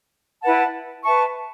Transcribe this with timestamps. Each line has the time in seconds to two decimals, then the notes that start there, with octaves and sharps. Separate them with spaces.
0.42 E4 B4 F#5 A5
1.02 B4 E5 A5 C#6